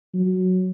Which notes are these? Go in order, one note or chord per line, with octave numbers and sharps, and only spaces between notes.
F#3